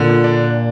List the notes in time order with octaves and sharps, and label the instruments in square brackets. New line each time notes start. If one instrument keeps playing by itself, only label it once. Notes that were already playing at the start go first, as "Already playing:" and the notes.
Already playing: [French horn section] A#2 [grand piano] D3
[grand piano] D4